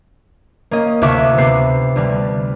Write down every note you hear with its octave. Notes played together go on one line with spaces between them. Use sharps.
A#3 C#4 D#5
D2 C3 F4 E5 C#6 D6
C3 B3 C7
D2 D3 G3